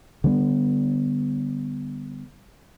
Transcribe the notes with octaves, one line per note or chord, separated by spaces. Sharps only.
D3 G3 B3